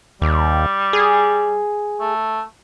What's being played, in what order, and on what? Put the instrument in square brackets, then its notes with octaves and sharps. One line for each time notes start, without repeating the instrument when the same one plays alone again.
[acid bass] D#2 [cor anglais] G3
[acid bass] G#4
[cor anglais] A3